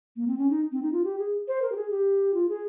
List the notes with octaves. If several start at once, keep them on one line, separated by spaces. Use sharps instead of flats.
A#3
C4
C#4
D#4
C4
D#4
F4
G4
G#4
C5
A#4
G4
G#4
G4
F4
G#4